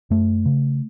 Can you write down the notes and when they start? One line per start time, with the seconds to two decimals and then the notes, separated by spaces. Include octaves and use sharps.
0.10 F#2 A3
0.46 C#3